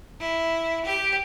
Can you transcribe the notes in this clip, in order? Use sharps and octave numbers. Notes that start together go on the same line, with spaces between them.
E4
G4